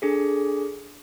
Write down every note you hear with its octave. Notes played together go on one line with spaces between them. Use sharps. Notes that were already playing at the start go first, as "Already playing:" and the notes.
D4 G#4 A4